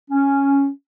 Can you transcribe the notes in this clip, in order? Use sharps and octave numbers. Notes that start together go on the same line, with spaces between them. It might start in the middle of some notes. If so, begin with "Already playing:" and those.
C#4